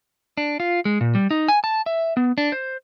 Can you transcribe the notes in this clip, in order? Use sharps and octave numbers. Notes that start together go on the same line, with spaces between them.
D4
F4
G#3
A#2
G3
D#4
G#5
A5
E5
B3
D4
C5